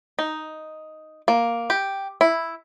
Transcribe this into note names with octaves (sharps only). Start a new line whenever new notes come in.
D#4
A#3
G4
E4